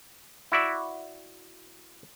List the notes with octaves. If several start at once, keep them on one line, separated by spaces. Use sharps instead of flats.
E4 F#4 D5 E5